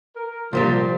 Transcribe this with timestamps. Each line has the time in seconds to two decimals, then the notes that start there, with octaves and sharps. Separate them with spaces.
0.17 A#4
0.53 C2 A#2 F3 G3 C5